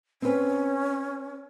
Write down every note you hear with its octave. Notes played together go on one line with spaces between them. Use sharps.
C4 C#4 B4